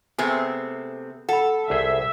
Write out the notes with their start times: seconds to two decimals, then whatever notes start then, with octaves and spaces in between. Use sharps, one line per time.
0.19 C3 A3 B3 C4 G#4 G#5
1.29 A4 F#5 B5
1.70 C2 G#4 C5 E5